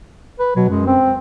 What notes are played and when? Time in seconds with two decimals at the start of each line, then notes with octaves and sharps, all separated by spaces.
0.40 B4
0.56 B2 F#3
0.69 F#2 G#3
0.86 C4